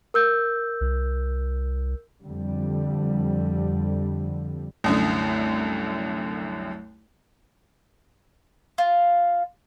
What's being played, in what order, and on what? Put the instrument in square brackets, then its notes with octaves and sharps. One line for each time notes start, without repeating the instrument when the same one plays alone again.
[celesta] A#4 E6 G6
[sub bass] C2
[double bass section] F2 D3 G3
[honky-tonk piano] C2 F#2 D3 [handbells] A3 D#6
[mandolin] F4